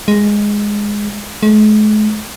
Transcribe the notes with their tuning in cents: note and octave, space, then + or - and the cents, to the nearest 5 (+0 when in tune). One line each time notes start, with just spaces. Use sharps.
G#3 -5
G#3 +45